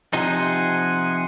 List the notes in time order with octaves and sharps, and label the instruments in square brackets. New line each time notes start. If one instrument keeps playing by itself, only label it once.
[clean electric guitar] C3 F3 D#4 [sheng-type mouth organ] F#5 G#5 C6